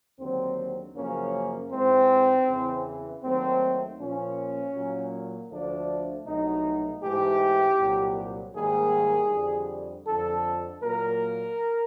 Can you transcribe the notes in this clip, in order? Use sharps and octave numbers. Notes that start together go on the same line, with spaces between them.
D#2 D3 F#3 C4
F#2 C#3 F3 A#3 C#4
G#2 E3 G#3 C4
E2 C#3 E3
D#2 D#3 F#3 A3 C4
A#2 F3 A#3 C#4
A#2 F#3 A#3
D2 D3 F3 A3 D4
C2 B2 F#3 A3 D#4
G#2 E3 A3 G4
C2 A#2 F#3
G#2 D#3 G3 A#3 G#4
F2 D3 G3
F2 D3 F3 A4
A#2 F#3 A#3 A#4